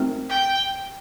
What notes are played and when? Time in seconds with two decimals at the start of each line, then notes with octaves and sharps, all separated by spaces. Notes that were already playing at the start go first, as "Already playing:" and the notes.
Already playing: A3 C4 D#4 F#4 A#4
0.30 G5